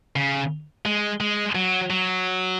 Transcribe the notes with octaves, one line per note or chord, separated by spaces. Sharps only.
C#3
G#3
G#3
F#3
F#3